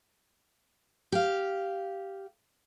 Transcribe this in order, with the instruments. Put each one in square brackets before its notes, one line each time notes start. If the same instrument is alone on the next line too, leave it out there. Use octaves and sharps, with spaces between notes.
[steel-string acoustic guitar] G4 F5